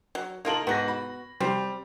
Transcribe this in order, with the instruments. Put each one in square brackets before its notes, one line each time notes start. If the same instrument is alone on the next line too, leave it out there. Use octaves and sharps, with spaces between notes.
[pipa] F#3
[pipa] A#3 F4 A4 [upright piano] D#4 A#4 F#7
[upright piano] G#2 A#6 [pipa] B3 F#4
[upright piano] B5
[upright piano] G3 [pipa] C4